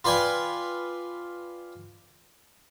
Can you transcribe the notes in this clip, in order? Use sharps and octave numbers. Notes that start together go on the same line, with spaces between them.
F4 B4 D5 G5 G#5